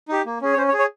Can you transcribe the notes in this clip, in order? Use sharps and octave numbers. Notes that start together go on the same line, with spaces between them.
D#4 G4
A#3
C#4 G#4
C#5
C#4 C5
C#5
G#4
C#5